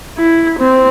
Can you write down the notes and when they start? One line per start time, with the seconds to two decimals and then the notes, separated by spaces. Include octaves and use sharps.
0.18 E4
0.59 C4